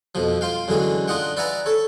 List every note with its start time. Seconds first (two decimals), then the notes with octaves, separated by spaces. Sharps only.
0.15 F2 B2 F3
0.41 F4 F5 G5
0.68 F#2 D3 E3 G#3 F#4
1.08 D4 F4 D#5 F#5 G5
1.37 B4 D5 E5 F#5 G#5 A#5
1.66 A4 C#5